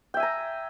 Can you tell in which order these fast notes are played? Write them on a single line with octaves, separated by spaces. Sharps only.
G5 E5 G#5 A#5